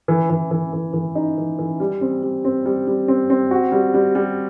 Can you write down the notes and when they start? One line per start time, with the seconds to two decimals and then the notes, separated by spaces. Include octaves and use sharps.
0.08 E3
0.30 E3
0.51 E3
0.73 E3
0.94 E3
1.15 D#4
1.37 E3
1.59 E3
1.80 G3
2.01 C4
2.23 G3
2.44 C4
2.66 G3
2.87 G3
3.08 C4
3.30 C4
3.51 F#4
3.72 G3
3.94 G3
4.15 G3